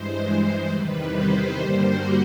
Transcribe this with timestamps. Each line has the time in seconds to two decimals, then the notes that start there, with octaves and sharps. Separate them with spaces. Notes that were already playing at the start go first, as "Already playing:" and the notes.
Already playing: G2 E3 G#3 C5
0.24 C5
0.69 E2 C3 D#3 G3 B4
1.14 C5
1.58 G2 D3 G3 A#3 C5
1.88 F#4